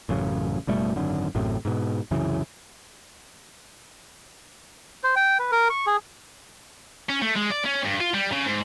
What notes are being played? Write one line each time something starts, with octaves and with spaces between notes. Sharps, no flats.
A1 F#2 C#3
F#1 B2 G3 A3
G#1 F#2 D3
A1 F#2 A2 C3
G#2 B2
C2 F#2 C#3 E3
C5
G5
B4
A#4
C#6
G#4
C#4
A3
G#3
D5
C#4
G2
F4
G3
C#3
G#2